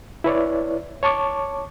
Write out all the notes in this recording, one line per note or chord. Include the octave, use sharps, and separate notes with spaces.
E4 B4 C#5 D5
C#5 A5 C#6 D6